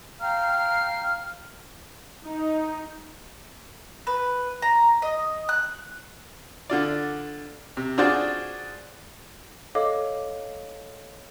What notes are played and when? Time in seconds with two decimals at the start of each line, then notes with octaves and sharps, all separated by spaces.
0.19 F5 G5 A#5 F6
2.25 D#4
4.07 B4
4.62 A#5
5.02 D#5
5.49 F#6
6.70 D3 F4 D5
7.77 C3
7.98 D4 F4 F#4 G#4 C5 D5
9.75 A4 C#5 D#5 F5 D6